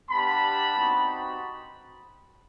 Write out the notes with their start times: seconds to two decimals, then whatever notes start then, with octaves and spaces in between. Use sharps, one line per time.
0.10 G3 B3 D4 G4 A5 B5
0.76 C4 D#4 F#4